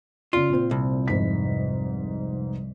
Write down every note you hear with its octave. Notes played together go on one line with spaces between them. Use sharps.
C#3 F4 D5
A#2 C4
C2
F1 G#2 B6